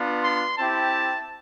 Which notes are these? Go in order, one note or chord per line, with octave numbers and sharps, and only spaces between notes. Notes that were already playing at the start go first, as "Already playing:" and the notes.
Already playing: B3 D4 F4
C6
C4 E4 G4 A5